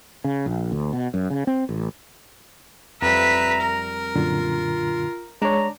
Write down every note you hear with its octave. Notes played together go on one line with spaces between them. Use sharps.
C#3
A#1
D2
B2
F#2
C#3
C4
A1
F2 G3 B4 E5 A#5
A#4
F#2 A#2 D3 F4
G#3 D4 C#5 A#5